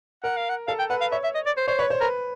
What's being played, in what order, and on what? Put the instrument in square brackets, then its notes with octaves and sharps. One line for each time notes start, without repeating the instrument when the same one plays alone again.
[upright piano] A#4 [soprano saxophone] F#5
[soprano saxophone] F5
F#5
[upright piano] A4 [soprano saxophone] F5
[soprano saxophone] G5
[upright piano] B4 [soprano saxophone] F#5
[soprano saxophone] F5
[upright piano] C#5 [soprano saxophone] E5
[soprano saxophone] E5
D#5
D5
C5
[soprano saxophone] C5 [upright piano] C#5
[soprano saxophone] B4 [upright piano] C#5
[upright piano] C5
[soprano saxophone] A#4 [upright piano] B4